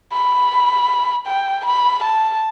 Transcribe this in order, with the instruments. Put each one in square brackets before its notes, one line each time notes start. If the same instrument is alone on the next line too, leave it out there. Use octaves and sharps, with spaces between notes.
[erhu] B5
G5
B5
A5